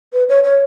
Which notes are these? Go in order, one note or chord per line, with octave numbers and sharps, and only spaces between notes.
B4
C#5
C#5